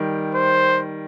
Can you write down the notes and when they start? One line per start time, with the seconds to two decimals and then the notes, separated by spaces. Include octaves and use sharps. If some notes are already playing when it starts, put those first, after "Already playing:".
Already playing: D#3 G3
0.35 C5